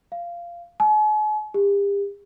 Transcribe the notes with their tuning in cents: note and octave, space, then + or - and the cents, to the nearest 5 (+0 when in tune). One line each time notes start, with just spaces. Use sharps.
F5 -15
G#5 +45
G4 +40